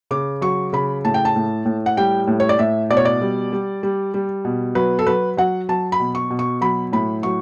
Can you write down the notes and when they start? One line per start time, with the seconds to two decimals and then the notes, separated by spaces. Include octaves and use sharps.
0.11 C#3 D6
0.41 F#3 C#6
0.73 C#3 B5
1.05 A2 A5
1.14 G5
1.25 A5
1.36 A2
1.65 A2
1.86 F#5
1.97 G3 G5
2.27 A2
2.40 C#5
2.49 D5
2.58 A2 E5
2.90 B2 D5
2.97 C#5
3.05 D5
3.21 G3
3.53 G3
3.83 G3
4.14 G3
4.45 B2
4.75 F#3 B4
4.99 A4
5.07 F#3 B4
5.37 F#3 F#5
5.69 F#3 A5
5.92 B5
5.99 B2
6.15 C#6
6.30 B2
6.39 C#6
6.61 F#3 B5
6.92 A2 B5
7.23 F#3 C#6